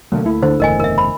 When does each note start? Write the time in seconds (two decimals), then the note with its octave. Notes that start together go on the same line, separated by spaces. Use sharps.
0.12 B2 D3 F#3 A3 A#3
0.25 D2 A3 E4
0.43 D3 A4 C5
0.60 F#1 E2 A2 A#4 D#5 G#5
0.80 A#4 E5
0.98 C5 B5